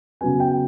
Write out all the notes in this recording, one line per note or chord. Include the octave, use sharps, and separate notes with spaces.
C#3 F#3 B3 G#5
G5